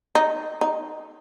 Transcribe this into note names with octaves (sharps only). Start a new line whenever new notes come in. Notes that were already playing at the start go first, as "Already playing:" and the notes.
D#4
D#4